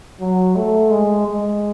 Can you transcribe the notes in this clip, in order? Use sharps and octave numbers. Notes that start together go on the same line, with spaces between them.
F#3
A3
G#3
G#3